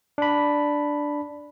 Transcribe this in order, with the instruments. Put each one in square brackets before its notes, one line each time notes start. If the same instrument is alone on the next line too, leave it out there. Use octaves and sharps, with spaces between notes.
[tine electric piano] D4 B5